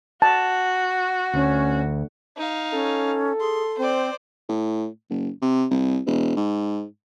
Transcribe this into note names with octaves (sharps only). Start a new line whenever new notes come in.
F#4 A5
D2 C#4
D#4 F5
C#4 A4
G#4 C6
C4 C5 D5
A2
F#1
C3
C2
E1
G#2